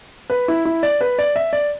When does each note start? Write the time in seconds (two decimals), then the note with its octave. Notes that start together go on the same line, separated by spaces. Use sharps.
0.30 B4
0.48 E4
0.65 E4
0.83 D5
1.01 B4
1.19 D5
1.36 E5
1.53 D5